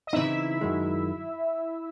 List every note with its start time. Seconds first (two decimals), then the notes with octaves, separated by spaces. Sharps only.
0.07 D#5
0.13 C#3 E3 C4 D#4 E4 E5
0.61 F#2 D#3 G#3